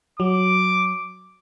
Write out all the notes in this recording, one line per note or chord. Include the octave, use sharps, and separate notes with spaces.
F#3 D6